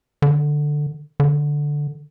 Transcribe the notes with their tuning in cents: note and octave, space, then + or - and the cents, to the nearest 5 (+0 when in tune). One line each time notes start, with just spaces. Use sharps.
D3 +10
D3 +0